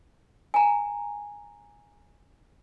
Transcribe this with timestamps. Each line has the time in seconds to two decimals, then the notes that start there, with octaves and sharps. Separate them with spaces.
0.54 G#5 A#5